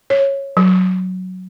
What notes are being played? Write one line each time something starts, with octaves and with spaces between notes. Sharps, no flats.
C#5
F#3